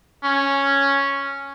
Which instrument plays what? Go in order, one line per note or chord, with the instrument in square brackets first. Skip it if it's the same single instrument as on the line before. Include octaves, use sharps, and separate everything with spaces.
[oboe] C#4